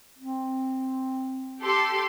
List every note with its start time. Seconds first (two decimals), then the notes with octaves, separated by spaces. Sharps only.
0.19 C4
1.60 G4 A4 C6